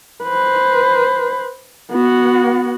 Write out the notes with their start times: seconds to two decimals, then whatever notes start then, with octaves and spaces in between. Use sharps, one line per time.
0.24 B4 C5
1.92 B3 F#4